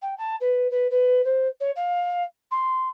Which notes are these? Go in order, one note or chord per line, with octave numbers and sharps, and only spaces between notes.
G5
A5
B4
B4
B4
C5
C#5
F5
C6